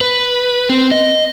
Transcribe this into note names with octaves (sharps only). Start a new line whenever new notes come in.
B4
C4
D#5